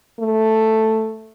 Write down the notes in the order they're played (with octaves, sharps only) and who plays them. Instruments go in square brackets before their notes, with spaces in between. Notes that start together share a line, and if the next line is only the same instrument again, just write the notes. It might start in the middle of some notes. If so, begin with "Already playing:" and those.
[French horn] A3